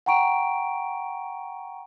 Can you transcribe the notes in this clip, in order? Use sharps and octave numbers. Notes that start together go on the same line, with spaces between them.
F#5 G5 A#5 C#6 D7